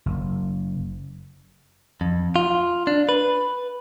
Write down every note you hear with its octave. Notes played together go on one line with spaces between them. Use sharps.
F#1
F2
F4
D4
B4